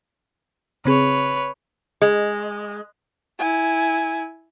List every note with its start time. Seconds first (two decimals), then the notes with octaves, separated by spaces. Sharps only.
0.85 C#3 C4 G#4 B4 C#5
2.02 G#3
3.39 E4 G#5